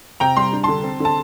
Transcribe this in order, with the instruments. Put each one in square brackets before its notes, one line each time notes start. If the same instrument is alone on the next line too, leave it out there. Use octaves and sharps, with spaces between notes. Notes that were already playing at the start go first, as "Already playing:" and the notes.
[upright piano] C3 G5 A#5
G3 C6
D4
D3 A5 C6
C4
D3 A5